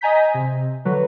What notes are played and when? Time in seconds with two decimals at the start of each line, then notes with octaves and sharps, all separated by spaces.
0.01 D#5 G#5 A#5 G6 B6
0.34 C3
0.85 D3 F#3 B4